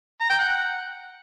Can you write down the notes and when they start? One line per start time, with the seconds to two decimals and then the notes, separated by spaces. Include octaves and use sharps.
0.21 A#5
0.30 G5
0.39 F#5